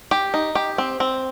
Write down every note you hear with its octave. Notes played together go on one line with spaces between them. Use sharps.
G4
D#4
G4
C4
C4